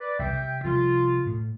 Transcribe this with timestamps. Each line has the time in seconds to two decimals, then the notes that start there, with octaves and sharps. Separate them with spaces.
0.01 B4 D5
0.19 C2 B2 E5 G5
0.33 C3
0.65 C3 F3 G3 F4
1.27 A2